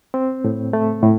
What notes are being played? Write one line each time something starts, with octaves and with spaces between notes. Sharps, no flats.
C4
A2
A3
A2